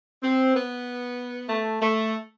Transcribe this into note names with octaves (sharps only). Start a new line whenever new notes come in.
C4
B3
A3
A3